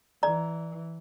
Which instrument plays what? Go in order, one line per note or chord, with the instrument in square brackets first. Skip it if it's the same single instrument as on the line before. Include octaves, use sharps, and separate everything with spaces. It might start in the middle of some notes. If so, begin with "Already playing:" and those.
[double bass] E3 [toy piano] D5 A#5